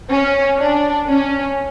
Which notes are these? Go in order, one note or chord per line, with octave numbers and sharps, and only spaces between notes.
C#4
D4
C#4